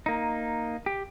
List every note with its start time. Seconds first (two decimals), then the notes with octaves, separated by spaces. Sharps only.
0.06 A#3 D#4
0.86 G4